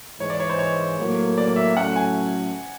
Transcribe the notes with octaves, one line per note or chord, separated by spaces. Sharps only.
G#2 E3 G#3 C#5
D5
C#5
C5
C#5
A2 F#3 A#3
D5
E5
A2 F#3 A3 C#4 F#5
G#5